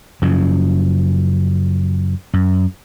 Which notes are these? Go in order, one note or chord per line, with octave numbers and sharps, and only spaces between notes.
F#2 C#3 F3
F#2